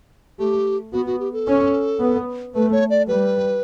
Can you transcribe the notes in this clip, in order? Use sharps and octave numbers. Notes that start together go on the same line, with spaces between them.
A3 G4
B3 F#4
F#4
G4
A4
C#4
B3
A3 B4
C#5
D5
G3 B4